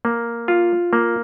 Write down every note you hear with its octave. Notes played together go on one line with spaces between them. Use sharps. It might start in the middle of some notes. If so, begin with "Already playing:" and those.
A#3
F4
A#3